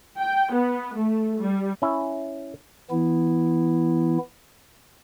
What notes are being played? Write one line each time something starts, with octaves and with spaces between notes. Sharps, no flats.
G5
B3
A3
G3
C#4 E4
E3 B3 E4